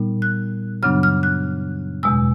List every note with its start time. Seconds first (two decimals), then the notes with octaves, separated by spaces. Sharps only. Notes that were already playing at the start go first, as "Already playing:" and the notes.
Already playing: A#2 G3 B3 D#4
0.22 F#6
0.83 F#2 C#3 F#3 B3 D4 F6
1.03 F6
1.23 F#6
2.03 E2 B2 G#3 E6